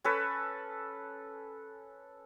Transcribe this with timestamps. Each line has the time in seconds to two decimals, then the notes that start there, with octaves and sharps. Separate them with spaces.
0.04 C#4 A4 B4